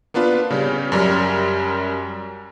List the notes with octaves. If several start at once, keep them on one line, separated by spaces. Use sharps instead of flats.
A#3 B3 D4 F4 B4
C#3 G3 C#4
F#2 G3 A#4